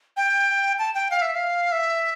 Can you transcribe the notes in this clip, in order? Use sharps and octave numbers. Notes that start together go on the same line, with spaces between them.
G5
A5
G5
F5
E5
F5
E5